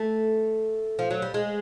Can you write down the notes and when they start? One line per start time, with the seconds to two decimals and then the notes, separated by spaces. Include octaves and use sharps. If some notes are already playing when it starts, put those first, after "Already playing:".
Already playing: A3
0.99 F3
1.11 F#3
1.22 G3
1.34 G#3